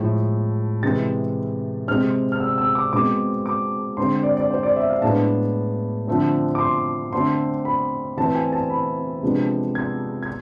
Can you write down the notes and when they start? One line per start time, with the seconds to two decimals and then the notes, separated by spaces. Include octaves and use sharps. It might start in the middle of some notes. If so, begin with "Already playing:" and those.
Already playing: A2 F3 G#3
0.82 C3 E3 G#3 A6
1.88 C3 G#3 C4 F6
2.32 F6
2.40 E6
2.58 E6
2.75 D6
2.93 B2 G#3 C4 D6
3.46 D6
3.97 D3 G#3 C4 C6
4.23 D5
4.37 D5
4.51 C5
4.63 D5
4.76 E5
4.90 F5
5.02 A2 G#3 B3 D4 A5
6.07 D3 F3 A3 C4
6.55 D6
6.60 C6
7.12 D3 A3 C4 C6
7.65 B5
8.17 E3 A3 C4 A5
8.35 G#5
8.53 A5
8.70 B5
9.23 C3 F3 G#3 B3 D4
9.75 G#6
10.23 G#6